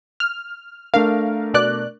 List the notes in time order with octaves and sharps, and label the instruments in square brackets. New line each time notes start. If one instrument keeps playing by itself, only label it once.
[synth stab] F6
[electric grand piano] A3 D4 A#4 [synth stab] F5
[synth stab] B2 D5 F#6